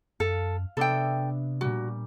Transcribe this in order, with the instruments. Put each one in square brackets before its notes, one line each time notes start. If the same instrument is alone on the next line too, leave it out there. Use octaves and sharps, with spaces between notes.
[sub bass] F#2 [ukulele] A4 [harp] F5
[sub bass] C3 [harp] B3 D4 E5 [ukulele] A4 G5
[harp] A#2 G3 [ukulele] F#4